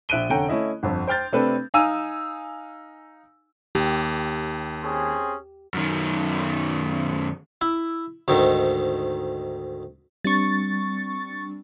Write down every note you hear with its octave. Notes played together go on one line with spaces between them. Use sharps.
A#1 E5 F#6 D7 D#7 G7
F1 D3 C#4 F#5 G5 A#5
A3 C#4 E4 D#5
G1 F2
C5 G5 F6 G6 A6
C3 A3 C4 D4 A4 B4
D#4 F5 G#5 E6 D#7
D#2 G4
C4 C#4 G#4
F#2 D#3
E4
D2 G#2 D#3
G3 C4 D4 C#6 A6